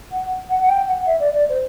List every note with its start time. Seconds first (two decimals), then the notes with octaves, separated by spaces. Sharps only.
0.11 F#5
0.49 F#5
0.63 F#5
0.68 G5
0.87 F#5
1.05 E5
1.19 D5
1.34 D5
1.48 C5